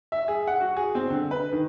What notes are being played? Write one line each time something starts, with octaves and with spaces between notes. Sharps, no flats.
E5
G#4
F#5
F#4
G#4
C4
D3
B4
D#3